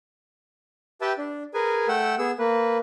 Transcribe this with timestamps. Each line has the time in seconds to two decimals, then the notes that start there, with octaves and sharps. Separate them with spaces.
1.01 G4 B4 E5 G5 A5
1.18 D4
1.54 G#4 A#4 B4 G#5
1.88 A3 F#5 G5 E6
2.19 B3 G#4 E6
2.39 A#3 B4